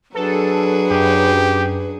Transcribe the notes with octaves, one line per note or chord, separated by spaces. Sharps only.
F#3 D4 G#4 A4 B4
F#2 G4